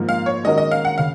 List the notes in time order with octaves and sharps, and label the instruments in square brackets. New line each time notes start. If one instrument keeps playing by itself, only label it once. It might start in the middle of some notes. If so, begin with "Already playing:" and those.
Already playing: [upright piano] G#2 F3 A#3
[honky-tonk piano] F5
C#5
[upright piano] D#3 G#3 C#4 F#4 A#4 [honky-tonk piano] D#5
[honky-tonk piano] D#5
F5
F#5
[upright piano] C#3 [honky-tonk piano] F5